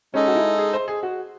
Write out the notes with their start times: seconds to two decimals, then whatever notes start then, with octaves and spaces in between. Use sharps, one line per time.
0.14 G#3 C#4 D#4 A4 D#5
0.27 F#4
0.36 E4
0.58 G#4
0.73 C5
0.88 G#4
1.03 F#4